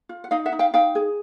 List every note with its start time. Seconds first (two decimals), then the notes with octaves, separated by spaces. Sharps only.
0.09 F4
0.24 F#5
0.31 D#4 D#5 F5
0.46 E5 F#5
0.52 D#4
0.59 F5 G5
0.74 D#4 F5 G5
0.95 G#4